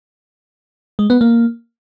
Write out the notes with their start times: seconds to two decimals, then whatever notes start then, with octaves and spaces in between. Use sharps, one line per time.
0.99 G#3
1.10 B3
1.21 A#3